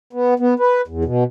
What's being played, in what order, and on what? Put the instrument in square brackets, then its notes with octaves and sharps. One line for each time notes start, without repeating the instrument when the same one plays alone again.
[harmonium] B3
B3
B4
E2
B2